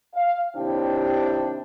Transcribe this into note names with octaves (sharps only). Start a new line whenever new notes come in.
F5
D#2 C3 D4 E4 C5 G5